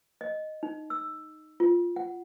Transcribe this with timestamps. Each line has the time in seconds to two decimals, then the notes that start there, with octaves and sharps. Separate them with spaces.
0.21 D#5
0.63 D#4
0.90 E6
1.60 F4
1.96 F#5